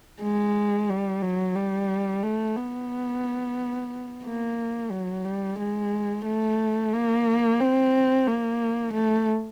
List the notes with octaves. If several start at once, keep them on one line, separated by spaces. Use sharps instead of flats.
G#3
G3
F#3
G3
A3
B3
A#3
F#3
G3
G#3
A3
A#3
C4
A#3
A3